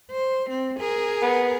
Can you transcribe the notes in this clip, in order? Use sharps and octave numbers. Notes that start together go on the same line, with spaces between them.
C5
C4
G#4 A#4
B3